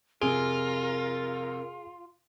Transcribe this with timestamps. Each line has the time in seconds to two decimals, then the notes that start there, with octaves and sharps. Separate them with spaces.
0.21 F2 C3 F4 G#4 A#4 D7